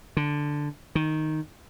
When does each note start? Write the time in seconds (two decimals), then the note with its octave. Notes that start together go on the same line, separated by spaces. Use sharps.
0.17 D3
0.95 D#3